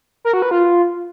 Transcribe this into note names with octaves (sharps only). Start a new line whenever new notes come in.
A#4
F#4
B4
F4